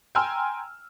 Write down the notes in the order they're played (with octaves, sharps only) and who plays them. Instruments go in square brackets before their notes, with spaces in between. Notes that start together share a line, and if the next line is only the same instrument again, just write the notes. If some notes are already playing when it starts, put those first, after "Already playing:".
[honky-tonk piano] G5 G#5 A#5 C6 E6 F6